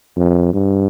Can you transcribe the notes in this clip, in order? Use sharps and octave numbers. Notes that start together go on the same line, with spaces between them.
F2
G2